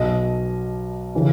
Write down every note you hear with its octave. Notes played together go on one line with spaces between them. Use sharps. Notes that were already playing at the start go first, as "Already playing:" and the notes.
Already playing: B1 B2 D#5
C#3 E3